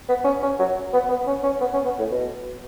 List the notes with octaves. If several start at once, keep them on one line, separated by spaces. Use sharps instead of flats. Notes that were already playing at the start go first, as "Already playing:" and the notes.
B3
C#4
C#4
F#3
B3
B3
C#4
C#4
B3
C#4
B3
A2
B2